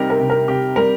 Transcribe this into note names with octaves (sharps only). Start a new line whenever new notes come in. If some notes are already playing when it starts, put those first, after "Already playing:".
Already playing: C3 G3 D#4 G4 A#4
A#4
C3
A#4
C3 G4
G3 A#4